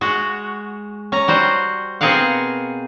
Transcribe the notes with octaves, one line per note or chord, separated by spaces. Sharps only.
G#3 F#4
C#4 A#5
G3 F#4 C5
B2 C4 G#4 A#4 F5 F#5